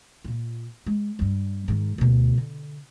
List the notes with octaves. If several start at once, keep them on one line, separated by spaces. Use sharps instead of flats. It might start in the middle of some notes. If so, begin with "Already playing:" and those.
A#2 F4
G#3
G2 G3
G#2 D#3
D2 B2
D3